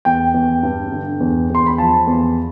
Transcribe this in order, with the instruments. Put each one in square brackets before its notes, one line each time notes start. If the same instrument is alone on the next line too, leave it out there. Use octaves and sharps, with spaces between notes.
[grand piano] E2 G5
E2
G2
D3
E2
E2 C6
B5
F3 A5
E2